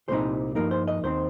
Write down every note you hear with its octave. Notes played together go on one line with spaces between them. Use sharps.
C2 A#2 G3 C4 D#4 C5
G2 F3 A#3 D#4 A#4
C5
D#5
D#2 D#3 C4 C5